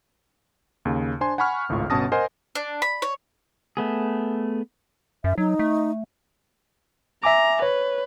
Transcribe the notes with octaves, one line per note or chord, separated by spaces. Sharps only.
D#2 C#3
D4 C5 G#5 C6
F#5 G#5 B5 C#6 F6
G#1 C#2 A2 F4 C#6
G1 B2 C#4 A5 D#6 A#6
A#4 C5 D#5 F#5 G#5 C6
D4
B5
C#5
A3 B3 G#4
F#2 E5
F#3 D#4
A3
E5 G#5 A#5 D6
B4 C#5